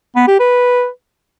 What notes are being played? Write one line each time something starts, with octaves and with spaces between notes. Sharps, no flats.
B3
G4
B4